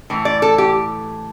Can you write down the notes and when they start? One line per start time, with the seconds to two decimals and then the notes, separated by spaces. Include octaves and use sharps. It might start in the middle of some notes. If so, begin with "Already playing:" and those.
0.10 A2 E3
0.25 D5
0.42 A4
0.58 G4